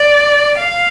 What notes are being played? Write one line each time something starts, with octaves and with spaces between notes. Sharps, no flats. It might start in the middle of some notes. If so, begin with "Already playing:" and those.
Already playing: D5
F5